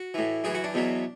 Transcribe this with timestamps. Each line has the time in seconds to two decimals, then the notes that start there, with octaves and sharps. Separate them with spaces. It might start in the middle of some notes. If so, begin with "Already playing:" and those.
Already playing: F#4
0.14 A2 E3
0.44 F#2 E3 G#4
0.55 F#4
0.64 D4
0.74 E2 B2 F#3